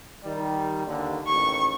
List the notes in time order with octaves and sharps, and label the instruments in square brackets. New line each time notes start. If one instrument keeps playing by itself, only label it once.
[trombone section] D#3 G3
D#2 D3
[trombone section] A1 D#2 [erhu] C#6